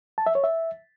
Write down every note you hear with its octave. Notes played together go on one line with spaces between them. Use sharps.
A5
E5
C#5
E5